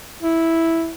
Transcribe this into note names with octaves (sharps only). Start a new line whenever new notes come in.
E4